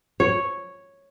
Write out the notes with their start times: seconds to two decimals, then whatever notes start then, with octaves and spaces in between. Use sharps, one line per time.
0.20 C#5